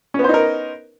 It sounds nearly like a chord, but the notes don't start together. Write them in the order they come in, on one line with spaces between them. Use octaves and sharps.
C#4 B3 C5 D#4 A#4